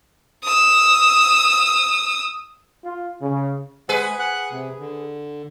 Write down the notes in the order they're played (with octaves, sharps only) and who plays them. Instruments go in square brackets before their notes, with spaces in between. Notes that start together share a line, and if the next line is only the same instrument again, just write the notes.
[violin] D#6 E6
[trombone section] F4
C#3
[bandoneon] G#3 F#5 [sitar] G#4 B4
[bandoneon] F#5 F#6
C3
D3